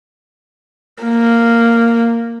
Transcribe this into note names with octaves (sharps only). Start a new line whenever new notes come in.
A#3